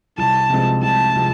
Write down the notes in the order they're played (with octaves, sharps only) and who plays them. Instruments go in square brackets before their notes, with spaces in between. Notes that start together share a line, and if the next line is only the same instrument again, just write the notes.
[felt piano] C2 [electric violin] A5
[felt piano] C3 F3 G#3 C4
[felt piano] C2 [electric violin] A5
[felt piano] C3 F3 G#3 C4